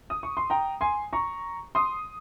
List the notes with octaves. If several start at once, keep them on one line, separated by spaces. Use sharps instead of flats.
D#6
C#6
C6
G5 A#5
G#5 C6
A#5 C#6
C6 D#6